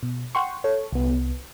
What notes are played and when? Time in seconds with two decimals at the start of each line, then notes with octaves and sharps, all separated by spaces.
0.03 B2
0.35 F#5 G5 C6 C#6
0.64 A4 C#5
0.93 C2 B3